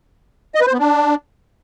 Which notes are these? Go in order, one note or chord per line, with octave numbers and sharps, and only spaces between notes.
D#5
B4
C5
B3
D4